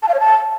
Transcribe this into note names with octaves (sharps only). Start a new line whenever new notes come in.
A5
F5
C#5
A5